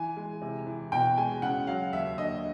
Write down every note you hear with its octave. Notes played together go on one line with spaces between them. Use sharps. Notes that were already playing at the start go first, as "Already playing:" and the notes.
Already playing: E3 G#5
G#3
C3
E3
B2 G5
G#3 G#5
C#3 F#5
F#3 F5
D#2 E5
D3 D#5